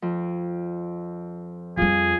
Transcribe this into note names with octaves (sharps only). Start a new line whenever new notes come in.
F2
F2 G3 F4 G#4